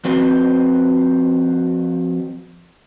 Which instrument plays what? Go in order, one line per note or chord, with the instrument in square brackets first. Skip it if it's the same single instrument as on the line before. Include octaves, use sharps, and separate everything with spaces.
[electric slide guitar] F3 C4 F#4 B4 C5